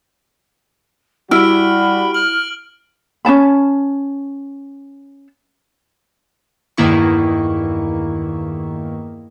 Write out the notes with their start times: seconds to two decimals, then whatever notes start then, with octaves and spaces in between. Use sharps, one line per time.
1.31 G3 E4 F#4 B5 F6 D7
2.14 F6 F#7
3.25 C#4 D4 A5 B5
6.77 E2 G2 D#3 A#3 E4 C#6